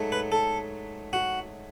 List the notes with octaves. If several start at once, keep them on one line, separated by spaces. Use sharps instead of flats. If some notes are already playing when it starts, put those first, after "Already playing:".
Already playing: G#2 F#3 A3
B4
A4
F#4